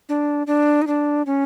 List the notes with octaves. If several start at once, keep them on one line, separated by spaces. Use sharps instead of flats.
D4
D4
D#4
D4
C#4